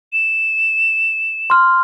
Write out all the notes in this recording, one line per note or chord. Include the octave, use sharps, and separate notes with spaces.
E7
C6 F6